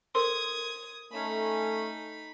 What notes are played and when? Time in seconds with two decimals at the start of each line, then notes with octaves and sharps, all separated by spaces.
0.15 A4 A#4 C5 C6 D#6 G#6
1.12 A3 C#4 D#4 B5